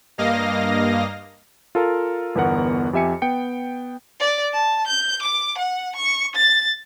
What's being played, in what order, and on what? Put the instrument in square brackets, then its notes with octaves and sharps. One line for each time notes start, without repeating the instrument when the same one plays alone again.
[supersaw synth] G2 A#3 D#5 F5 A#6
[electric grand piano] F4 A4 A#4 F5
G1 E2 B3 A#4 F#5
F2 G4 E5 G#5 C#7
B3 G5 C#7
[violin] D5
A5
G6
D6
F#5
C#6
A6